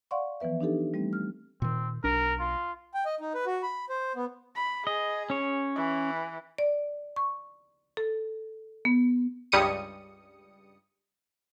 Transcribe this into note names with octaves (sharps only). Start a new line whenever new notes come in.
D5 F5 F#5 C6 C#6
E3 F3 B3 B4 E5
D4 D#4 G4 A4
G3 A3 C4
F6
A#2 D#3 C4
B1 D4 A#4
F4
G5
D#5
D#4
B4
F#4
B5
C5
B3
B5
G#4 D#5
C#4 C#5
E3
D5
C#6
A4
B3
C#2 G2 G3 D#6 C#7 D#7